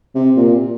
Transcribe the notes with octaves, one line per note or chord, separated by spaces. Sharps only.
C3
A#2